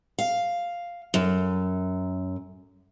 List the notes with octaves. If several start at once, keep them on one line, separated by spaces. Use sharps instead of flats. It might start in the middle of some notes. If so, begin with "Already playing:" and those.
F5
F#2